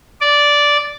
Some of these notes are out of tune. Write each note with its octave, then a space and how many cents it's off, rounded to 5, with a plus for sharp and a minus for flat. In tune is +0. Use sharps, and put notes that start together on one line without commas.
D5 -10